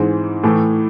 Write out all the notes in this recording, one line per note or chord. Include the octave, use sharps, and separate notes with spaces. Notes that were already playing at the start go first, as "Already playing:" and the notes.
Already playing: G#2 E3 G#3 C4
A2 E3 A3